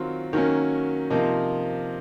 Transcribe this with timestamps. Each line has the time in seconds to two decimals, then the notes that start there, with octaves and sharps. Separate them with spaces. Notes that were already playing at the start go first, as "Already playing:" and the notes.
Already playing: D#3 F#3 C4 F4
0.33 D#3 F#3 A#3 C#4
1.10 C3 F3 A#3 D#4